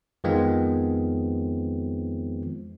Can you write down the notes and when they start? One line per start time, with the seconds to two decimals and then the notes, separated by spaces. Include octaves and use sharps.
0.24 F2 D#3 F3 G#3 B3 C4